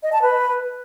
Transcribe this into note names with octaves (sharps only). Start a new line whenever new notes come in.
D#5
A5
B4